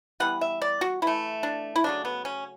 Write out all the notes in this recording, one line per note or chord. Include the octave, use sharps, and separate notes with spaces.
E3 G3 B3 F#5
E5
D5
F#4
E3 A3 E4
D4
E4
C#3 F#3 A3 D4
B3
C#4